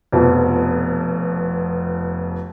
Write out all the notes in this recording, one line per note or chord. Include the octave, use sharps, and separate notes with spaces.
F1 F2 B2